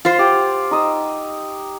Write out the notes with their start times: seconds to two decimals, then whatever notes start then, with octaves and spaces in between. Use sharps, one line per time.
0.05 F4 C5
0.18 G4 F#5
0.71 D#4 D#6 E6